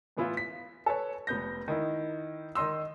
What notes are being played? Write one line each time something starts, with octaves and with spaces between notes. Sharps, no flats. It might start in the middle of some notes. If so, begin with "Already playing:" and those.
A2 E3 B3 E4 F4
B6
A4 B4 C#5
F1 B3 G6 A#6
D#3 D#4 E4
D#3 D#4 D#5 C6 E6